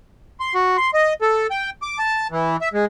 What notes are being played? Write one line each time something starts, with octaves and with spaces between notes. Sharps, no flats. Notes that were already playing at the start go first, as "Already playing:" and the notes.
C6
F#4
C6
D#5
A4
G5
D6
A5
E3
E5
G#3